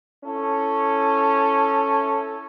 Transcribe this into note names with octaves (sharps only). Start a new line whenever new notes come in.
C#4 E4 A4